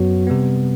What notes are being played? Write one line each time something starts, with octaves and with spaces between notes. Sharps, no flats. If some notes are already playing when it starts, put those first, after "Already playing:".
Already playing: F#2 F#3 B3 F#4
C3 G3 B3